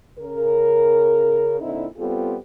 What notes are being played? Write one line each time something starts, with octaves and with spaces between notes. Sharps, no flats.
C#3 A#4
A#2 D3 C4 D#4 E4
G3 B3 C4 F4 G4 A4